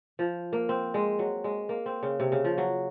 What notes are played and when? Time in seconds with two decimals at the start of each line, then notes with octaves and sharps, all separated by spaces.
0.19 F3
0.53 A#3
0.69 C4
0.94 G#3
1.19 F#3
1.44 G#3
1.69 A#3
1.86 C4
2.03 C#3
2.20 C3
2.32 C#3
2.44 F3
2.58 F#3